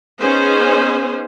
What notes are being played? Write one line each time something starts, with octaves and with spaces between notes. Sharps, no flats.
B3 C#4 D#4 G#4 C5